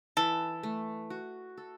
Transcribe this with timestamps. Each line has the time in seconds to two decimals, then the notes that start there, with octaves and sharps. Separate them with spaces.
0.17 E3 A4
0.63 A3
1.10 F#4
1.57 A4